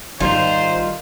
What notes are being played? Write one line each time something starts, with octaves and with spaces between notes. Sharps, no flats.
G#1 D#3 G3 D#4 F4 C5